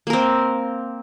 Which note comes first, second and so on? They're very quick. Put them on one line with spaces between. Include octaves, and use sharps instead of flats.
A#3 A#4 C4